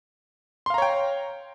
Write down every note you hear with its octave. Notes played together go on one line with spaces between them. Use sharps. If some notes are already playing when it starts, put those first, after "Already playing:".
C#5 F5 G5 A#5 C6